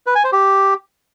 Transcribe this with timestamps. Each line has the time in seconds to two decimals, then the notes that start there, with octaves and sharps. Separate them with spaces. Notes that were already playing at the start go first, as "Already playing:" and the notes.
0.07 B4
0.15 G#5
0.24 C5
0.33 G4